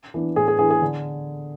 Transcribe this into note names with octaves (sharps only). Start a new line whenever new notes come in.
E3 B3 D4
A2 G#4
G#4
E3 B3 D4 G#4
G#4
D3